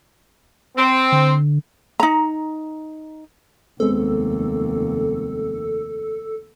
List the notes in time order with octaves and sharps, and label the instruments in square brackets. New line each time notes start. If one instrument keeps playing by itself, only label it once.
[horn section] C4
[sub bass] D3
[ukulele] D#4 A#5
[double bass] F1 D#2 [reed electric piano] G#3 B3 C4 [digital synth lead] A4